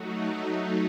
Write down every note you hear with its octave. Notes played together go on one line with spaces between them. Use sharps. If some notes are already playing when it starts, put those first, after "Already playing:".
Already playing: F#3 A3 D#4 F#4